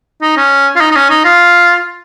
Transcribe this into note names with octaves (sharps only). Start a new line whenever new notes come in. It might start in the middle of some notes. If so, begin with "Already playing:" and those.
D#4
C#4
F4
D#4
D#4
C#4
D#4
F4